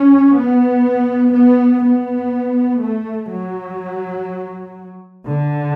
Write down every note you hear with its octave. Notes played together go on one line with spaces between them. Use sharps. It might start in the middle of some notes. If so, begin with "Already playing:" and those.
Already playing: C#4
B3
B3
B3
A3
F#3
D3